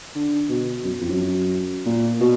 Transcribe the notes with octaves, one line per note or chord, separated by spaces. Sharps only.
D3
B2
F#2
F2
F#2
A#2
B2